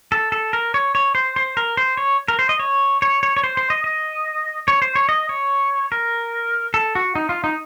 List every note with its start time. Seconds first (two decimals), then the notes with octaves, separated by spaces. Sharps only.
0.12 A4
0.32 A4
0.53 A#4
0.74 C#5
0.95 C#5
1.15 C5
1.36 C5
1.57 A#4
1.77 C5
1.97 C#5
2.28 A#4
2.39 C5
2.49 D#5
2.59 C#5
3.02 C#5
3.23 C#5
3.37 C#5
3.44 C5
3.57 C5
3.70 D#5
3.84 D#5
4.68 C#5
4.82 C5
4.96 C#5
5.09 D#5
5.29 C#5
5.92 A#4
6.74 A4
6.95 F#4
7.15 D#4
7.29 F4
7.44 D#4